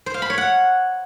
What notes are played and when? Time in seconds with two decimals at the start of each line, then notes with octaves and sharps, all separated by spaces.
0.06 C5
0.14 F5
0.22 B5
0.30 C#5
0.38 F#5